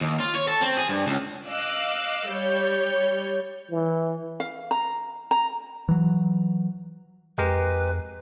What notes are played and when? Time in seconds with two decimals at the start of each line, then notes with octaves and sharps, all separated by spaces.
0.01 D#2
0.20 F4
0.35 C#5
0.48 A4
0.62 C4
0.77 G#4
0.89 G2
1.07 C#2
1.48 D#5 F5 D6 E6 F#6
2.30 G3 C#5 G6
3.71 E3
4.40 F5
4.71 A#5
5.31 A#5
5.89 E3 F#3
7.38 F2 G#3 G4 A#4 B4